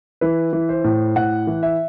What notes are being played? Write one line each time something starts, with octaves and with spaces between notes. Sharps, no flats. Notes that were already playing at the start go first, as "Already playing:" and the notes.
E3 B4
E3
C5
A2
A2 F#5
E3
E5